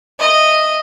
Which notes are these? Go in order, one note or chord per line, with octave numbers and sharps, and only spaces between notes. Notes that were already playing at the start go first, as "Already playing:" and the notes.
D#5 E5